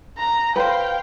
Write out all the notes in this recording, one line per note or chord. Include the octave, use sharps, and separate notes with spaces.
A#5
B4 C5 F5 G5